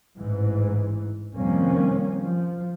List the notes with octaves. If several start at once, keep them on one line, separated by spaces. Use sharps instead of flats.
A1 G#2 E3
F2 C3 D#3 G3 A#3 C#4
F3